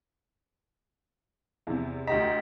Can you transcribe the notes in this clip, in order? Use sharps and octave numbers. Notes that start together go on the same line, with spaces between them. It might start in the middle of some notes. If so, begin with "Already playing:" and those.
E2 C3
D2 G4 D#5 A#5 B6